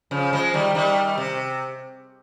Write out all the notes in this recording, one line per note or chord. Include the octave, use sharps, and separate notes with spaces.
C#3 F3
F3 G#3
D#3 G3
D#3 G3
C3